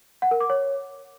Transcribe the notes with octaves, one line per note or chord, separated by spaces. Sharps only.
F#5
A#4
D6
C#5